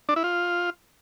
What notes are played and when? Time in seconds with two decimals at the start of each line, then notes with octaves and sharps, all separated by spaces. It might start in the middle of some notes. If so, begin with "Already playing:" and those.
0.09 D4
0.16 E4
0.24 F4